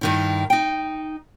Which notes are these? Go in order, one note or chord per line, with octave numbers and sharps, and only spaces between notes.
G2 D#3 E4
D#4 G5